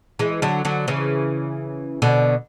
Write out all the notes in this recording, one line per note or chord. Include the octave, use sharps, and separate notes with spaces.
E3 G#3
D3 F#3
D3 F#3
C#3 E3
B2 D3